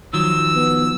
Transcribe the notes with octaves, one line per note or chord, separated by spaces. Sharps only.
D#3 F3 F#3 E6
B3